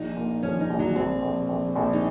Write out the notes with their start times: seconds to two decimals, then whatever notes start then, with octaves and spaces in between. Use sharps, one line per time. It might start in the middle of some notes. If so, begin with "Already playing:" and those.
Already playing: A#1 D#4
0.17 A#2
0.43 F3 C#4
0.60 D#4
0.70 A#1
0.79 F#3
0.96 A#1 C4
1.22 A#1
1.49 A#1
1.75 A#1
1.93 D#4